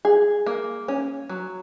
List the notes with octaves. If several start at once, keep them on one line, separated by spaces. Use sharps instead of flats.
G#4
A#3
C#4
F#3